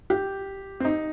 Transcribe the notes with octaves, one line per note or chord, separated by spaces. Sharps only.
G4
C4
D#4